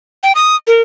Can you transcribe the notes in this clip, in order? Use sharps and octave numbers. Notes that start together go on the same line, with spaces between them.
G5
D#6
A#4